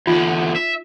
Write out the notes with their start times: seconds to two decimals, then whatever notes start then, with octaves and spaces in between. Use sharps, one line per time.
0.07 E2 D3 D#4 F4
0.56 E5